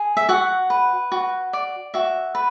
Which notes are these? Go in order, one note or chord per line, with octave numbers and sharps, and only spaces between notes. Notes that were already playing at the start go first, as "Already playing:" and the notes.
Already playing: G#4
E5
F#4 F#5
B4
F#4
D5
F#4 E5
B4